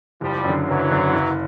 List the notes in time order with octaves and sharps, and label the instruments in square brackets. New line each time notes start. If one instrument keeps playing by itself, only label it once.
[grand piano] F#1 [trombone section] F3 G3
[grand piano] F#2 D3
[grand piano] F#1 [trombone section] E3 F#3
[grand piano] F#2 D3
F#1